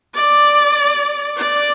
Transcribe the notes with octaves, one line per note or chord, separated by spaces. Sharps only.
D5
D5